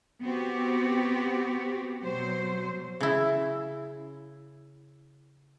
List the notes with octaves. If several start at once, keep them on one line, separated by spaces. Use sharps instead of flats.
B3 C4 F#4 G4
B2 F#3 C5
C#3 E4